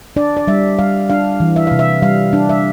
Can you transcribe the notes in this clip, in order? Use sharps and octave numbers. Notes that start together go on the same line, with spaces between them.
D4 D5
D5
G3 E5
G3 F5
D4 F5
E3
E5
C3 F5
E5
G3 F5
D4
E5